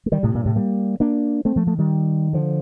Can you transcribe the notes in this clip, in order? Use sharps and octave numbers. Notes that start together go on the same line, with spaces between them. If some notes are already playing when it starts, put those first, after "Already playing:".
A3
D#3 G3
A2 C3
G2 A#2
A2 C3
G3 A#3
A#3 D4
A3 C4
F3 A3
F3 A3
D#3 G3
D3 F3